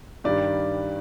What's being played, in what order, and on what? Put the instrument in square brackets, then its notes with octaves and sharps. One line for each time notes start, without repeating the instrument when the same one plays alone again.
[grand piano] G2 D#3 G3 D5